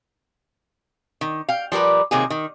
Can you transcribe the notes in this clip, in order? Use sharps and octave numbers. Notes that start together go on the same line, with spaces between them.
D#3
F5 G5
F3 G3 A#4 B4
C3 D#3 F#3 A#3 G#4
D#3